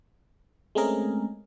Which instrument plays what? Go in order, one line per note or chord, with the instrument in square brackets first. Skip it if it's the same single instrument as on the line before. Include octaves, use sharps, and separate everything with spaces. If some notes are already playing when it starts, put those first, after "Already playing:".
[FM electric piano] G#3 A3 C4 C#4 G#4 A#4